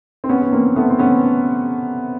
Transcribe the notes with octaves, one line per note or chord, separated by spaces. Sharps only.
C4
B3 C#4
B3
A#3 C4
A3 B3
C4
B3 C#4